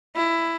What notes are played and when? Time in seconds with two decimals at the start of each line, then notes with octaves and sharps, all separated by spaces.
0.16 E4